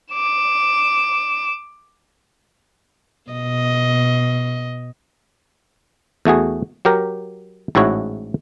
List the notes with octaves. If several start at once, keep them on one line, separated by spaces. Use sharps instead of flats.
D6 E7
B2 D#5
E2 A3 F#4 G#4
F#3 G4 A#4
A1 G#2 E4 F#4 C#5